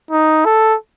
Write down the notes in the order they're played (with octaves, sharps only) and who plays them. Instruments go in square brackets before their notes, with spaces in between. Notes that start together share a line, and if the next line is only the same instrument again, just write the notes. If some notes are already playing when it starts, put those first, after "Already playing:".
[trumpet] D#4
A4